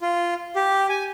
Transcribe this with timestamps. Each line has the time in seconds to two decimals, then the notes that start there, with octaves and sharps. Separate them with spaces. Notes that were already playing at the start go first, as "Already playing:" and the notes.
0.02 F4
0.56 G4
0.89 G#5